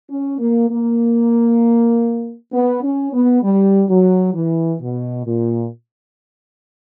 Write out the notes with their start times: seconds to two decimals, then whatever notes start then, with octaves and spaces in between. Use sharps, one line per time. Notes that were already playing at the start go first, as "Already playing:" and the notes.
0.09 C#4
0.39 A#3
0.70 A#3
2.52 B3
2.83 C#4
3.14 B3
3.43 G3
3.89 F#3
4.34 E3
4.81 B2
5.26 A#2